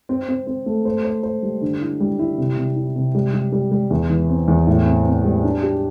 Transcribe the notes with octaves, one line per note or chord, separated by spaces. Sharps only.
C4
C4
C4
A3
C5
C5
C5
G3
D3
E4
G3
E4
C3
C3
E4
C3
G3
G3
G3
G3
E2
E3
C4
E2
A2
C4
C4
G3
D4
G4